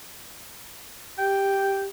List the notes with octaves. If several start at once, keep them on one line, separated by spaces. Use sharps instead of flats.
G4 G5